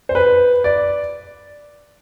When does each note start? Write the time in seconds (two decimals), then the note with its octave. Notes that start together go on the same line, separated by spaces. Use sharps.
0.09 C5
0.15 B4
0.64 D5